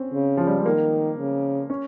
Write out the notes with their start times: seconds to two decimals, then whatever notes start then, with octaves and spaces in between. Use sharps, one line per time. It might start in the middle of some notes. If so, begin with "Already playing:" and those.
Already playing: C4 C#4
0.13 C#3
0.37 F3
0.47 G3
0.56 G#3
0.66 D#3 A#3
1.18 C#3
1.70 C#4